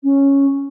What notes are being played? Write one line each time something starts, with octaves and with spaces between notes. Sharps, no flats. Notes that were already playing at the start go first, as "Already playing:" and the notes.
C#4